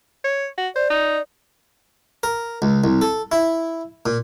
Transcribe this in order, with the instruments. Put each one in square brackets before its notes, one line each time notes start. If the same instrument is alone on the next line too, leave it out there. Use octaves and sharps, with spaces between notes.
[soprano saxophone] C#5
F#4
[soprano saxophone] C5 [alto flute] D5
[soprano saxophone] D#4
[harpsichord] A#4
C#2
C2
A4
E4
A#2